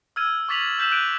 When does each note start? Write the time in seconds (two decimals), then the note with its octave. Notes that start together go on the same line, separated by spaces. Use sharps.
0.16 E6 F6 G#6 D#7
0.49 C#6 D6 A6 B6 F7 F#7
0.78 E6 F6 G6 B6 E7 F#7
0.91 F#6 G6 D7 D#7